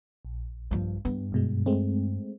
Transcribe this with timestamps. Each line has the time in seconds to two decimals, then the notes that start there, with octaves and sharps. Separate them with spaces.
0.25 A#1
0.71 G2 F3
1.05 G2 B3
1.32 F#2 B2 G#3
1.66 G#3 A3 C4